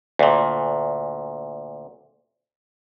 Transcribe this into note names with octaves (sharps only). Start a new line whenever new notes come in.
D2 A#2